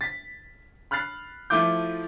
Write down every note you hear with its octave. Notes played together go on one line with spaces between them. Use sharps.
A6 B6
B5 F6 F#6 A6 C7
F3 A3 E4 F4 D6 G6